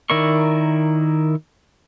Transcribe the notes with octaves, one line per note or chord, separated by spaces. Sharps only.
D#3 E4 A#4 D5 C#6